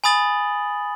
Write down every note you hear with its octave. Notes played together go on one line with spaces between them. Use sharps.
G#5 B5 D#6 A6 F#7